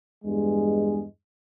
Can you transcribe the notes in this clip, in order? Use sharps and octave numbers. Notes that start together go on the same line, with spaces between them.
E2 G2 G#3